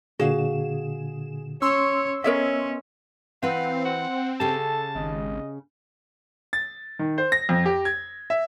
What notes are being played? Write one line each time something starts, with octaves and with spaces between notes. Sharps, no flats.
A#2 D3 F#4 G#4 F5 E7
C#4 C#5 C6 C#6 E6
B3 C#4 A#4 C#5 D#5 E5
E3 C4 B4 F5 F#5
C5 F#5
C#3 G4 A4 A5
G#1 D#5
A6
D#3
C5
A#6
F2
G4
G#6
E5